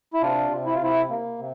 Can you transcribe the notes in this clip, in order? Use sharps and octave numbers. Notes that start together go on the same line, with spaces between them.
E4
C3 D4 F4
C3
E4
F4
C3 E4
A#3
C3